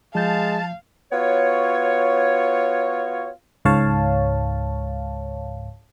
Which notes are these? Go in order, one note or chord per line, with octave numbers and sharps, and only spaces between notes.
F3 G#3 F5 A5 G6
B3 F4 F#4 C#5
C#2 G#2 C#5 F5 A5